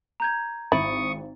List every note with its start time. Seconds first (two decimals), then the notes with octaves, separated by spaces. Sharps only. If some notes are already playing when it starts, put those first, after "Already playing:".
0.20 A#5 G6 G#6
0.72 G#1 E4 C#6 D#6 A6